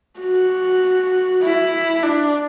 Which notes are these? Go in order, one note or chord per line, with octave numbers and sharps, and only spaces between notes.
F#4
E4
D4